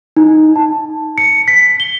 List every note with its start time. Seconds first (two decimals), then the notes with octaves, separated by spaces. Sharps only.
0.17 D#4
0.56 A5
1.18 C#7
1.48 B6
1.80 G7